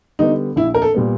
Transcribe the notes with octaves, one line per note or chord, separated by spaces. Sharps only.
D3 G3 B3 D#4
A#1 E4
A#4
A4
A#2 G3 B3